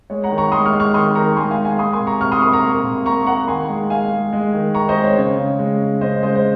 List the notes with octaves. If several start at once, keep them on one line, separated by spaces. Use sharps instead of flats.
G#3 C#5
F#5 A#5
D#3
A#5 C#6
G#3 C6 D#6
C#6 F6
G#3
C#6 F6
D#3 C6 D#6
D#3 A#5 C#6
G#3 G#5 C6
F5 G#5
G#3
F5 G#5
A#3 C6 D#6
G#5 C6
C3
A#5 C#6
C3 C#6 F6
C6 D#6
A#3 C6 D#6
A#5 C#6
A#3
C3
A#3 A#5 C#6
A#3 F#5 A#5
D#3 G#5 C6
G#3
G#3 F5 G#5
G#3
G#3
D#3
D#3 A#5 C#6
C5 D#5
G#3
C#5
C#3 C#5
C#3
G#3
C#3
C#3 C5 D#5
G#3 C5 D#5
C5